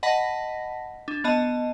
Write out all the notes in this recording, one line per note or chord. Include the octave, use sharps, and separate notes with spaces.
D#5 F#5 A5 B5 A#6 B6
D4
B3 D#5 A5